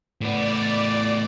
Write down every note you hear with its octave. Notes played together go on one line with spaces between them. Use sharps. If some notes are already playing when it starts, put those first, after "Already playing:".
A2 B3 D5